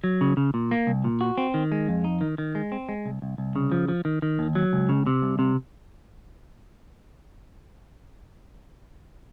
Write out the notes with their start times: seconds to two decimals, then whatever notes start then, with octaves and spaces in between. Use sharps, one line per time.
0.04 F#3
0.21 C#3
0.37 C#3
0.54 A#2
0.71 A#3
0.87 C2
1.04 A#2
1.21 F#4
1.38 C4
1.54 D#3
1.72 G#3
1.88 F2
2.04 D#4
2.21 D#3
2.38 D#3
2.55 G#3
2.72 C4
2.89 G#3
3.06 C2
3.22 C2
3.38 C2
3.56 C#3
3.72 F3
3.88 F3
4.05 D#3
4.22 D#3
4.39 D#2
4.55 F#3
4.73 C#2
4.89 C#3
5.06 C3
5.22 C2
5.39 C3